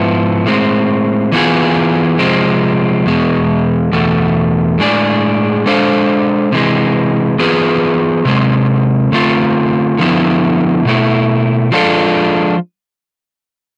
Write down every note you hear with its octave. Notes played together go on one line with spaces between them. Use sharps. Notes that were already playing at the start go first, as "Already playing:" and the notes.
Already playing: G#2 F3 B3 E4
A2 G#3 C4
E3 B3 F4 G#4
C3 F3 G#3 C4
E2 B2 G#3
E2 B2 A3
A2 G#3 D4 G#4 D5
G#3 D4 A4 C5 F5
C3 E3 G#3
E3 B3 F4 G#4 B4
C3 G#3 C4
D3 A3 C4 F4
D3 F3 B3 E4
B2 A3 E4
F3 G#3 D4 F4 A4